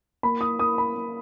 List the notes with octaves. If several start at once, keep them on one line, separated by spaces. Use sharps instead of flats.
A#3 B5
D#6
A#3 D#6
B5
A#3